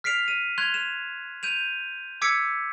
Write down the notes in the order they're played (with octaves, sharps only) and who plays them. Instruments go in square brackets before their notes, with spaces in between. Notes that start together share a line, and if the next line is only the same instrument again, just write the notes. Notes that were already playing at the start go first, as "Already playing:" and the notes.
[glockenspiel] F6 B6 C7 D7 F7
D#7
C6 F#6 G#6 F7
E7
G6 D#7 F7
D6 E6 G#6 B6 C#7 D7